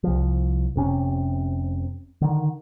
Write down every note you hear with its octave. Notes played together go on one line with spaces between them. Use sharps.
C2 F3
F1 C3 C#4
D3 D#3